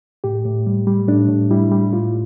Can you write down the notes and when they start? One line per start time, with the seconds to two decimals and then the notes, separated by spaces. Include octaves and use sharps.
0.24 A2 G4
0.45 A2
0.67 G3
0.87 G3
1.08 A2 D4
1.29 A2
1.51 G3 E4
1.71 G3
1.92 A2 F4